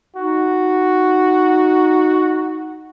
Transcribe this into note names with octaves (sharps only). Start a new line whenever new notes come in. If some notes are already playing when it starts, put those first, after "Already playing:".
D#4 F#4